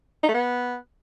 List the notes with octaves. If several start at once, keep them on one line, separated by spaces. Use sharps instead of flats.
D#4
A3
B3